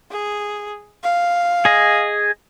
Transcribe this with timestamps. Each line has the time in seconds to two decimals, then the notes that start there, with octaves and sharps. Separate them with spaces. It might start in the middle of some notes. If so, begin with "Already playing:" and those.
0.11 G#4
1.03 F5
1.65 G#4 D#5